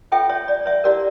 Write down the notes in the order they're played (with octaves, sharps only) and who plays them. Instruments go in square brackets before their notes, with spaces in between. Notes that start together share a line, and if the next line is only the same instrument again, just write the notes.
[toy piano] F4 A4 C#5 E5 G5
C#5 E5
D5
C#5 E5
E4 G4 A#4 D5 F5